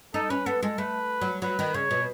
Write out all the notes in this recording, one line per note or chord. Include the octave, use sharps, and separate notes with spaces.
D#4 A4
C#4 B4
B3 A4
G#3 A4
A3 B4
F#3
F#3 B4
D#3
C#3 C#5
B2